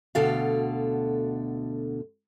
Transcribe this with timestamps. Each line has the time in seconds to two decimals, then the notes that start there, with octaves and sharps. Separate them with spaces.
0.15 D2 B2 D3 A4 F5